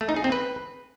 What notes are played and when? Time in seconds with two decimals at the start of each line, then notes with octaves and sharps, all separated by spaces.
0.01 A3
0.09 D#4
0.16 G#4
0.24 C4
0.32 B4